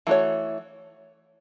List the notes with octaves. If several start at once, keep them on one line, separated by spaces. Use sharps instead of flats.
E3 A3 F#4 C#5